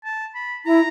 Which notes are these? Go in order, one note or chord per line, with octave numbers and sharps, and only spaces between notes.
A5
B5
E4 A#5